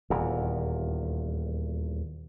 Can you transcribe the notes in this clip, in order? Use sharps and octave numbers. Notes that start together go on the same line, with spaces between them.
D#1 E2